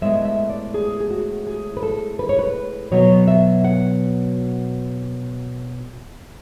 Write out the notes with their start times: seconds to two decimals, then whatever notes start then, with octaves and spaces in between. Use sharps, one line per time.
0.01 A2 G#3 B3 E5
0.25 E5
0.50 D5
0.74 G#4
1.00 G#4
1.10 F#4
1.47 G#4
1.77 B4
1.83 A4
2.19 B4
2.29 C#5
2.39 B4
2.92 B2 F#3 B3 C#5
3.28 E5
3.64 F#5